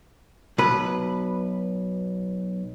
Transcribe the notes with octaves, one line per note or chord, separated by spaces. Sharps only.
B1 B4